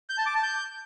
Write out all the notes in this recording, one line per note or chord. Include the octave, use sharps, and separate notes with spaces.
G6
A5
D6
A5
G6